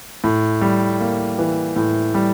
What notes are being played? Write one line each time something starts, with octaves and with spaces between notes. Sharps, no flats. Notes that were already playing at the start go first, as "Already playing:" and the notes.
A2
G3
A#3
E3
A2
G3